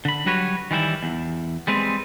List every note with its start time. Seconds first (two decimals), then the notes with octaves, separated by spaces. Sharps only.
0.05 D3 B5
0.26 F#3 G3 F#4 B4 C#5
0.71 D#3 E3 G3 E4
1.03 E2
1.67 G3 G#3 C4 B4